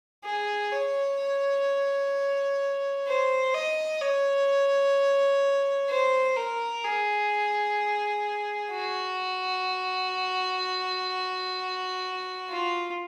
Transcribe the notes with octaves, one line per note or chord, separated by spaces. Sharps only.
G#4
C#5
C5
D#5
C#5
C5
A#4
G#4
F#4
F4